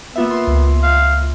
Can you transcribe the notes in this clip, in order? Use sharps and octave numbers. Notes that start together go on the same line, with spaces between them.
A#3 B3 F4 E5
C6
C#2
F5